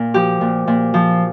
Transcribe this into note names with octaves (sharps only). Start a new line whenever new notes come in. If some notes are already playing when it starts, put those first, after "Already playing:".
Already playing: A#2
F3 G4
A#2
A#2
F3